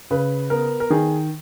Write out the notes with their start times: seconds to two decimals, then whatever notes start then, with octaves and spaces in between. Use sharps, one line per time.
0.11 C#3 B4
0.50 B3 A#4
0.80 A#4
0.90 D#3 G#4